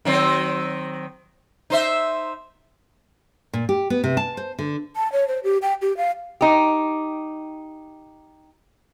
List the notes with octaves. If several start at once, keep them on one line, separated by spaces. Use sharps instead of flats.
D#3 F#3 C4
D#4 C5 E5
A#2
G4
B3
C3
A5
C5
D3
A5
C#5
C5
G4
G5
G4
F5
D#4 G4